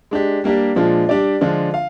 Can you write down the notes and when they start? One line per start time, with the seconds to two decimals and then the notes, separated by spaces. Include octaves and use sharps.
0.11 G#3 D4 G4
0.44 G3 A#3 D4 G4
0.76 A#2 F3 G#3 D4 F4
1.09 G3 D4 G4 D5
1.41 D3 F3 G#3 D4 F4
1.74 F5